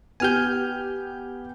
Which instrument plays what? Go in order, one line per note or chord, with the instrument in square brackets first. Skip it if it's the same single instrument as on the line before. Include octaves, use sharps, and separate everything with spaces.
[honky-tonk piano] B3 G4 [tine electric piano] G#5 F6 G6